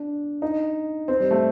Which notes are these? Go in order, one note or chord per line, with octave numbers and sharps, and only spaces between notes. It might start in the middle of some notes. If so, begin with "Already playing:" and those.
Already playing: D4
D#4
C4
G3
A3